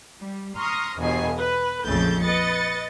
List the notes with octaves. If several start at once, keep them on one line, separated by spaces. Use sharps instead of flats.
G3
A#5 C6 C#6 D#6 F6 A#6
G1 E2 B2 D#5 G#5 C7
B4
A#1 F2 C#3 A3 G6 A6
B4 D#5 A6 C#7